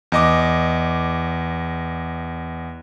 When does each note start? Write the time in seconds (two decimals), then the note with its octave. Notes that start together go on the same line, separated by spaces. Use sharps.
0.12 E2 D#5 D6